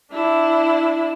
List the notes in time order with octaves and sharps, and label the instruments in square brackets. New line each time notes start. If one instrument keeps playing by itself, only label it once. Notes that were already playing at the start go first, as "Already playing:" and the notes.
[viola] D4 E4